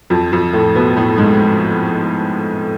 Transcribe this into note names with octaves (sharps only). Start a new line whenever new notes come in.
F2 F3
F2 F3
A2 A3
B2 B3
A2 A3
G#2 G#3